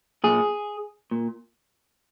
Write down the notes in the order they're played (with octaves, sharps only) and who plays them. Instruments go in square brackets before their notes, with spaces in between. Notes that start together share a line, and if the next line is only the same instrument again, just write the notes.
[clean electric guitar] A#2 G#4
A#2